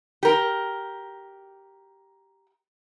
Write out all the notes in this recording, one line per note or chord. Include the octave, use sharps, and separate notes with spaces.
G4 A#4